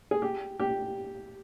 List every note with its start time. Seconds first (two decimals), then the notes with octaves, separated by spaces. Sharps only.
0.11 G#4
0.22 G4
0.60 G4